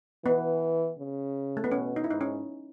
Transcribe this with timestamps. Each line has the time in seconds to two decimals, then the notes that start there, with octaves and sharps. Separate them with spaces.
0.25 E3 B3
0.99 C#3
1.57 A3
1.64 B3
1.72 B2 C#4
1.96 D#4
2.04 E4
2.09 G#2 D#4
2.21 C#4